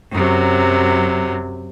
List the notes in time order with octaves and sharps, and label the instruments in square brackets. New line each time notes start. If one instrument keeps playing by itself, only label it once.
[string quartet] F#2 C3 F#3